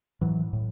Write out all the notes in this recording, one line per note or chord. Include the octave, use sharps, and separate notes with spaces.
A2 E3 F#3
A2